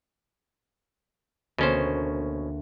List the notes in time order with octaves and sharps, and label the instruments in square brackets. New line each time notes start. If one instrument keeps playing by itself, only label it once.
[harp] D2 A#3 [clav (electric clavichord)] B2 C#4 C5